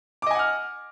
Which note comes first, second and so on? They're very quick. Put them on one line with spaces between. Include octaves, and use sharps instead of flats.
D6 D#5 G#5 F#5 F6